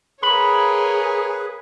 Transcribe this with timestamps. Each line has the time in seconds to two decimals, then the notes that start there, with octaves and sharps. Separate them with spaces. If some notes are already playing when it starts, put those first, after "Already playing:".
0.23 A#3 G#4 B4 C#5 B5